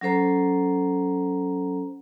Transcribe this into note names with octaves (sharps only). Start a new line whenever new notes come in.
F#3 C#4 A4 C5 A#5